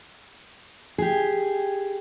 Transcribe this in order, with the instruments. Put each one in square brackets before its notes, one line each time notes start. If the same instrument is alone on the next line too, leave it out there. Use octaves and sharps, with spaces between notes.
[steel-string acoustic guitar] G4 G#4